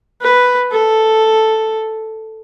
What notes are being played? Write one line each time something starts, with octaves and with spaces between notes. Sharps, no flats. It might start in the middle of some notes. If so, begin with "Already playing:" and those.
B4
A4